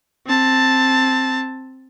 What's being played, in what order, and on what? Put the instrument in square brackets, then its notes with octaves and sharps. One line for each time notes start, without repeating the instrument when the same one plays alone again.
[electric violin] C4 A5